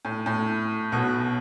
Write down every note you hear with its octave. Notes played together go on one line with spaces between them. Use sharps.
A2
A2
B1 B2